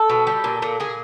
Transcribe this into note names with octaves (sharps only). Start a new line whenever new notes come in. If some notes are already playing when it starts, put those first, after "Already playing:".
Already playing: A4
B2
G3
A#2
A#2
A#2 G#4